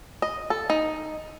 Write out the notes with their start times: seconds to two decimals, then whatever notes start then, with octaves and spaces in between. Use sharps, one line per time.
0.22 D#5
0.50 A4
0.70 D#4